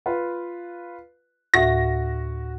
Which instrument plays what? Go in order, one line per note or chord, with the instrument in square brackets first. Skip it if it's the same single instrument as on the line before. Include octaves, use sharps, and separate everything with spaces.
[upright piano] F4 B4
[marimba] D2 A2 E5 [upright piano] F#4 [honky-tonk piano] A#6